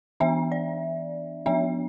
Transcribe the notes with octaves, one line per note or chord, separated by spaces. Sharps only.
E3 B3 D4 E5
D5
F3 B3 D4 E5